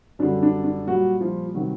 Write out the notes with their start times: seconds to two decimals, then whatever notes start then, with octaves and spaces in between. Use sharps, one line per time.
0.19 F#2 D3 G3 D4
0.43 D4
0.64 D4
0.87 A#2 F#3 G3 F#4
1.21 F3 F4
1.55 C3 D#3 F#3 G3 F#4